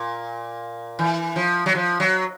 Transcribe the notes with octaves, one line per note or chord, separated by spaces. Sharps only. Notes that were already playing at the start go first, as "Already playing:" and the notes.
Already playing: A#2
E3
F3
F#3
F3
F#3